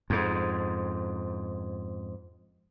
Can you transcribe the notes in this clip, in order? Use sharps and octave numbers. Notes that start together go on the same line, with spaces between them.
F2 G#2